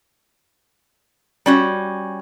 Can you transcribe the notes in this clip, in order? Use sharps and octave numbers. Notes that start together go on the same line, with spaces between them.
G3 C#4 F#4